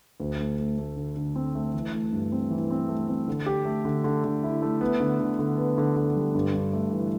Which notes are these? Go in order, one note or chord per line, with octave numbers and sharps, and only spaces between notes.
D2
A3
A3
A3
D3
D3
C4
A3
E3
A3
G2
C4
E3
C4
A3
C4
D3
G4
A3
D3
D3
D3
E4
A3
B3
D3
D3
D3
B3
D3
D3
G3
G2
G2
A3
E3